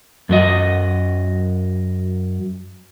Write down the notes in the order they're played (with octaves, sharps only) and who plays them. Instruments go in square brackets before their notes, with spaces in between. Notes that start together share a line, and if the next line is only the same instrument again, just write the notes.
[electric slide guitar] F#2 F#3 D#5